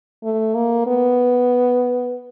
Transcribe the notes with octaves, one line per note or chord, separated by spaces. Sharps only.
A3
A#3
B3